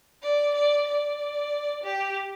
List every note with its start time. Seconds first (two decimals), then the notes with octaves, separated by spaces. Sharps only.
0.23 D5
0.55 D5
0.87 D5
1.84 G4